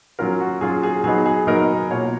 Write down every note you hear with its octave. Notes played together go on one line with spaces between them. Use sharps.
F#3 C#4 F4 A#4
F#4
F#3 C#4 F4 G#4
G#4
F#3 B3 D#4 G#4
G#4
F#3 B3 D#4 A#4
B2 A#3 F4 C#5